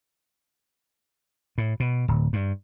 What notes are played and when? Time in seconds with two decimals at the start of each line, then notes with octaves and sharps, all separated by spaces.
1.58 A2
1.80 B2
2.08 D1
2.33 G2